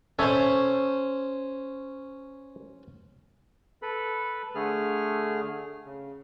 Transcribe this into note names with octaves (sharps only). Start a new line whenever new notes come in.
C#4 A4 C5 C#5 E5
A4 B4 B5
D3 A3 G#4 F6
C#3